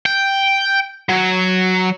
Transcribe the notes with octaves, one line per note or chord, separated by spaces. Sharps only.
G5
F#3